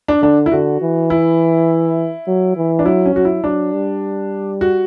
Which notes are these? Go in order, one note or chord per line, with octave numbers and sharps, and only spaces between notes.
D4
D3 D4
E4
D3 F#4
E3
E4
F#3
E3
D4
F#3 E4
C#4
F#3 F#4
E4
F#3 D4
G3
F#4